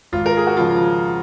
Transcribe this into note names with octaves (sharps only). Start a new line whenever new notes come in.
G#1 F4
A#4
G#4
F#4
C#3 F3 F4